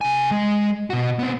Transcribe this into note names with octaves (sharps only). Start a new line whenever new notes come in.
C3 G#5
G#3
B2 F#4
B3 C4